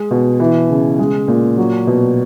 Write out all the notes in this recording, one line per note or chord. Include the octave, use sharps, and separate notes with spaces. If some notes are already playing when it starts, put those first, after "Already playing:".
Already playing: G#3
B2
E3
C#3
G#3
A#2
F#3
B2